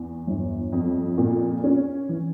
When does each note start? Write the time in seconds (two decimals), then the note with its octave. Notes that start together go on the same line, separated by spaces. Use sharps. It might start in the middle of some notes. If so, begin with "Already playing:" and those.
Already playing: E2
0.27 G1
0.73 F2
1.18 A#2
1.64 C#4
2.09 E3